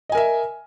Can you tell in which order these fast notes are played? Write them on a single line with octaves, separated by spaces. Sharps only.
D#5 G#5 A#4 E5